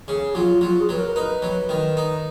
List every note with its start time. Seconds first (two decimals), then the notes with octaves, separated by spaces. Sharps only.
0.08 C#3 G#4
0.35 F#3 F4
0.61 F#3 F4
0.80 G#4
0.89 F#3 B4
0.98 A#4
1.16 D#4 B4
1.42 F#3
1.69 D#3
1.97 D#4